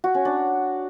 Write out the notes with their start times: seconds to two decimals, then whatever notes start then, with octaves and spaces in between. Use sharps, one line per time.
0.04 F#4
0.14 C#4
0.25 D4